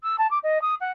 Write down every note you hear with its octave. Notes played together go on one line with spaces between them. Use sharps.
E6
A5
D6
D#5
D#6
F#5